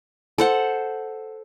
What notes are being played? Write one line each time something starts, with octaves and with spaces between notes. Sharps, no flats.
A4 C5 F#5